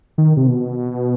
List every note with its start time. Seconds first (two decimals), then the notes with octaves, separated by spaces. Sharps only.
0.18 D#3
0.37 C3
0.47 B2